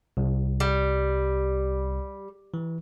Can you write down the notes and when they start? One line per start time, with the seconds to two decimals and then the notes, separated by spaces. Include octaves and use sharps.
0.17 C2
0.60 G3
2.54 E3